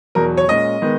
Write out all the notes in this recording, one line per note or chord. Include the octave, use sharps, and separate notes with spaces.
E2 B2 F#3 A#4
C#5
A#2 G#3 C#4 D#5
D#3 G#3 B3